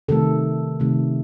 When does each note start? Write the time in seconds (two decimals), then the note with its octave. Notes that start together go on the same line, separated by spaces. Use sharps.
0.08 C3 D#3 A3 A4
0.80 C3 D#3 A3